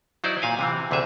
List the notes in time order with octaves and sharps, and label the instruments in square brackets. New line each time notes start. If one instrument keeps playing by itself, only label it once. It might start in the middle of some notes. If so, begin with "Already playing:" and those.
[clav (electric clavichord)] F#3 D#4 E4 C5 D5
A#2 F5 G#5
C3 E3 C4
D2 C3 E3 G#4 E5